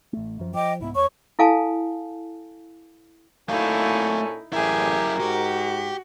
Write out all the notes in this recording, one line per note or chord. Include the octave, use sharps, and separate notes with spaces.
A1 A3
F#2 F3
F3 D#5 G5 D6
C2 G#2 B3 E4
E2 C#5 C#6
E4 A4 F5 G#5 A5
A#2 A3 C#4 D#4 E4 F#4 A4 F5
A1 F#2 E4 G4 G#4 A#4
G#2 F#4 G4